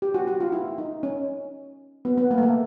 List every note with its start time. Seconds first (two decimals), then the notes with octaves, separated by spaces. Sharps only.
0.02 G4
0.15 F#4
0.28 F#4
0.40 F4
0.52 E4
0.78 D#4
1.03 C#4
2.05 B3
2.18 B3
2.31 A#3
2.38 A3
2.43 A#3